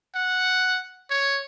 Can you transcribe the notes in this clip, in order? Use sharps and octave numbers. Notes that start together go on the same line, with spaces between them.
F#5
C#5